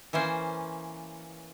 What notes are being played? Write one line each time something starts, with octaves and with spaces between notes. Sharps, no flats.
E3 A#3 C#4 C5